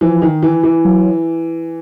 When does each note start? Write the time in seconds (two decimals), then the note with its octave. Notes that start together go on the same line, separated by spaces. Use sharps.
0.01 E3 F3
0.22 D#3
0.43 E3
0.63 E3
0.85 F#3